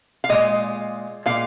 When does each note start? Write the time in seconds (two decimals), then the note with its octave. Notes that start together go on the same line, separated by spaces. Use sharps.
0.24 F5
0.29 A#2 G#3 D#5
1.26 A#2 G#3 F5